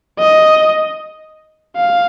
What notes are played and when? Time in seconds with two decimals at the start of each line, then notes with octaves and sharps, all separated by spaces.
0.19 D#5
1.77 F5